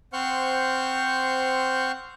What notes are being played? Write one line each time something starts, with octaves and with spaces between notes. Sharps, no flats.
C4 C5 F#5 C#6 F6 G6